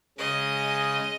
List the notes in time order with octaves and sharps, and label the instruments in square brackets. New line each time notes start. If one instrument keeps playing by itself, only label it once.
[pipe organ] C#3 G#3 [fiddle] D#5